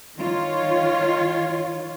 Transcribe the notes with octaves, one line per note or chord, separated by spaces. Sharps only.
D#3 F4 C#5